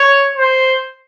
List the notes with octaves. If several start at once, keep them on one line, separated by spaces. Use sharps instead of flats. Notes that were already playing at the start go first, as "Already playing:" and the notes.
Already playing: C#5
C5